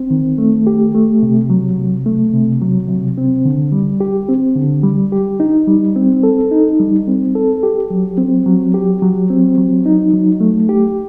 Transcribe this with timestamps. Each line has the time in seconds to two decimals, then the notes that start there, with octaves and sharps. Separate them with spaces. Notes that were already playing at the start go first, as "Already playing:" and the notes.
Already playing: C4
0.10 D#3
0.38 A3
0.67 G4
0.95 A3
1.23 C3
1.50 F#3
1.78 C3
2.06 A3
2.33 C3
2.62 F#3
2.89 C3
3.18 C4
3.45 D3
3.72 G3
4.00 G4
4.29 C4
4.56 D3
4.83 G3
5.12 G4
5.40 D#4
5.67 G3
5.96 C4
6.23 A4
6.51 D#4
6.80 G3
7.07 C4
7.35 A4
7.63 G4
7.90 F#3
8.18 C4
8.46 F#3
8.74 G4
9.02 F#3
9.30 C4
9.58 F#3
9.86 D#4
10.13 F#3
10.40 A3
10.69 G4